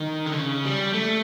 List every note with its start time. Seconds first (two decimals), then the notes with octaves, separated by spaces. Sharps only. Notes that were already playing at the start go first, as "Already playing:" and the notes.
Already playing: D#3
0.26 D3
0.36 C#3
0.65 G3
0.93 A3